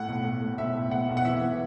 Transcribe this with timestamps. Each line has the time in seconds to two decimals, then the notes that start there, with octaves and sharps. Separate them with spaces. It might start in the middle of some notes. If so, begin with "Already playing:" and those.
Already playing: A2 F#5
0.08 B1
0.25 A2
0.42 A2
0.58 B1 E5
0.75 A2
0.91 B1 F#5
1.09 B1
1.17 F#5
1.25 E3 E5
1.42 E3